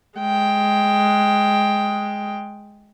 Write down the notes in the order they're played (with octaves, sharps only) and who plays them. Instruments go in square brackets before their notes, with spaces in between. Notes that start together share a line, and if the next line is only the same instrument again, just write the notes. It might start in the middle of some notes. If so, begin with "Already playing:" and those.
[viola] G#3 G5